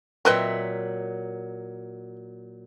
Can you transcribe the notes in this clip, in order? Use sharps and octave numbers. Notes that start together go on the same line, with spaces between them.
A#2 F#3 C4 B4 D#5 E5